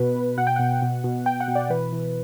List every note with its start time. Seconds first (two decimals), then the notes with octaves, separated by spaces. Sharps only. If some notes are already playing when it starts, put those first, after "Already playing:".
Already playing: B2 B4
0.16 B2
0.38 B2 F#5
0.47 G5
0.56 B2 F#5
0.82 B2
1.04 B2
1.26 B2 G5
1.40 F#5
1.48 B2
1.55 D5
1.70 E3 B4
1.93 E3